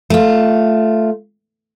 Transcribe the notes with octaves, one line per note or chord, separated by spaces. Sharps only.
A3 F4